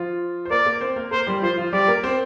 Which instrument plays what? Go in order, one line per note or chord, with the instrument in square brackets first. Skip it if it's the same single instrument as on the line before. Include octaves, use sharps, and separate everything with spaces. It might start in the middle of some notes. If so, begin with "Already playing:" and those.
Already playing: [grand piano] F3 F4
C5
[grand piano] A#3 A#4 [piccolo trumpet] D5
[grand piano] A#3 A#4
C4 C5
A#3 A#4
[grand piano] A#3 A#4 [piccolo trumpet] C5
[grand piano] G3 G4
[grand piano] F3 F4 [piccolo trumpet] C5
[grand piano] F3 F4
[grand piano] G3 G4 [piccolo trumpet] D5
[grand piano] A#3 A#4
C4 C5